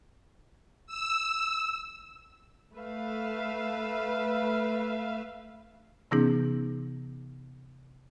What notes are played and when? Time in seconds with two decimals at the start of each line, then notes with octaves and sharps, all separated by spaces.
0.87 E6
2.74 A3 B4 E5 F5
6.11 C3 E3 B3 C#4 D#4 G#4